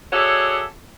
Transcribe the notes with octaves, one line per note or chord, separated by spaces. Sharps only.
F#4 G#4 A4 C#5 D5 E5